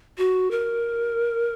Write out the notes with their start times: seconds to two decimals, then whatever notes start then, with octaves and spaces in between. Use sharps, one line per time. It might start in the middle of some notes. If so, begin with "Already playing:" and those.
0.18 F#4
0.51 A#4